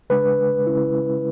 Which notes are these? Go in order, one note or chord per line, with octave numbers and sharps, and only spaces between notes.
C#3 G#3 D4 B4
C#3 G#3 C#4 E4